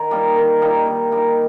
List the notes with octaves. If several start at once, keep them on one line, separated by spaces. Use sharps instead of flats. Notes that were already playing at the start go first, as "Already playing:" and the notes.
Already playing: D#3
G3 A#3 D#4
D#3
G3 A#3 D#4
D#3
G3 A#3 D#4